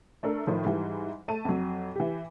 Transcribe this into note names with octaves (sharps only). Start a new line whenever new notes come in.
A3 D4 A4 A#4
A2 D#3 F3
G#2 E3 G3
A3 A5 D#7
F2 F#3
E3 G4